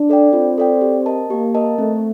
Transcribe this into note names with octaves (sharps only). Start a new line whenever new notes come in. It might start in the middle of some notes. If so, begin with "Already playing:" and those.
Already playing: D4
A4 D5 G5
C4 F4
A4 D5 G5
G4
A#4 D#5 A5
A#3 G4
A#4 D#5 A5
A3 C4